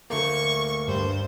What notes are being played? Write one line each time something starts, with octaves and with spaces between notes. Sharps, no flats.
D2 A3 A#3 C#6
G2 C5